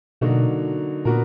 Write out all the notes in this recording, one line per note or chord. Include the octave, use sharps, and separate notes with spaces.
B2 D3 F#3 A#3 D#4 F#4
A#2 B3 D4 F#4 A#4